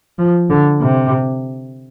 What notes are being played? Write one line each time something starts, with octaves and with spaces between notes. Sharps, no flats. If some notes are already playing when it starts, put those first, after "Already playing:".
F3
D3
C3